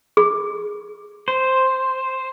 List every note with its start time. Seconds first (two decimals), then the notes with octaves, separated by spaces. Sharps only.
0.17 G#4
1.28 C5